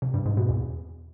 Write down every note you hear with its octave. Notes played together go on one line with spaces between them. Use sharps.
C3
G2
G#2
B2
E2